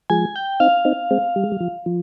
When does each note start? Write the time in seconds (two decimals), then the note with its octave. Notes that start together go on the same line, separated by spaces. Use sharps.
0.10 F3 G#3 G#5
0.36 G5
0.60 C4 D#4 F5
0.85 C4 D#4
1.11 G#3 C4
1.36 G3
1.43 G#3
1.52 G3
1.60 F3
1.86 F3